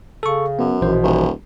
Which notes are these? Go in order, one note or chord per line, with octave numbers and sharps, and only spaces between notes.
C#3 A4 C#6
F#2 B3
A#1 B2 E3 C5
D#1